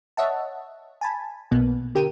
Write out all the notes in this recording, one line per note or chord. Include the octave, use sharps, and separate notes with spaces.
C#5 D#5 E5 F#5 A5
G#5 A5 B5
B1 B2 A#3 B3
D3 G4 A#4 G5 D#7